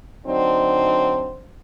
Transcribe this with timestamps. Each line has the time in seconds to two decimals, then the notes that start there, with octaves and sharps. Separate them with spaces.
0.25 D3 F#3 C4 D4 D#4